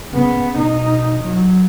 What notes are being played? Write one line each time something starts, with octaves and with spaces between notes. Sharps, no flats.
C#3 B3
B2 D#4
F#3